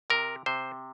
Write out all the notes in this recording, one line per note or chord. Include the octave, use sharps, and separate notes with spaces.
C3 A#4
C3 C5